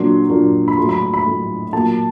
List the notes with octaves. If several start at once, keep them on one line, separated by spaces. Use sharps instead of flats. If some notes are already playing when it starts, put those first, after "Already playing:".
Already playing: A#2 F#3 A#3 D4 C6
A#2 F#3 A#3 D4
B5
A2 F#3 A3 C6
B5
B5
B5
A2 F#3 A3
A#2 F#3 A#3 A5